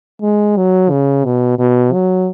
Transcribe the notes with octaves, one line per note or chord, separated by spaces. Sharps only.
G#3
F#3
C#3
B2
B2
F#3